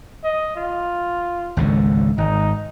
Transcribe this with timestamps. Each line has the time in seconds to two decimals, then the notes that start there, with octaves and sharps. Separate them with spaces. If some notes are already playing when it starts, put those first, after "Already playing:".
0.24 D#5
0.56 F4
1.57 G#1 C#2 D3
2.18 G#1 D#4